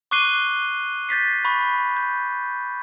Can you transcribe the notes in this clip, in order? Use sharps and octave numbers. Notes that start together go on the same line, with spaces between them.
C#6 D6 F#6 C7 D#7 G7
G6 A6 B6 C7
B5 C#6
G6